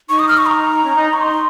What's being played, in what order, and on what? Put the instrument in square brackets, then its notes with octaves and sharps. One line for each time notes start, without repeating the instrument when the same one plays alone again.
[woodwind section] D#4 [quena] C#6
[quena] D#6
F6
C#6
A#5
[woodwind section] C#4
D#4
[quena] C#6
[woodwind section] D#4 [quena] C6